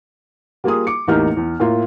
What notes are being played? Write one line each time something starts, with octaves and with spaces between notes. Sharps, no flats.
G3 A#3 F4 G#4 D#6
D6 C#7
A1 E2 A#3 D#4 G4 F6
E2
A2 A#3 F4